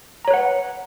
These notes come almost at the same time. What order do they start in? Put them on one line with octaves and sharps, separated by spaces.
A#5 C#5 B4 F#5